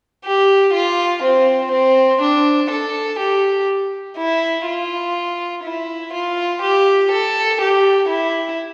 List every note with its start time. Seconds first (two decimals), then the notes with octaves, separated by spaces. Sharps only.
0.25 G4
0.74 F4
1.23 C4
1.72 C4
2.22 D4
2.71 A4
3.20 G4
4.18 E4
4.67 F4
5.64 E4
6.14 F4
6.62 G4
7.12 A4
7.61 G4
8.09 E4